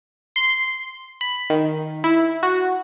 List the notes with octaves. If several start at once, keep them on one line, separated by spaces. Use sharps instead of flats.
C6
B5
D#3
E4
F#4